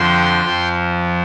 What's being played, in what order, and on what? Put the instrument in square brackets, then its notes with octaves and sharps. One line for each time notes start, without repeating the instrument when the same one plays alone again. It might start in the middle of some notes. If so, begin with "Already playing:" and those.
Already playing: [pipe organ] F2 D3 F3 G5 C6
F2 F3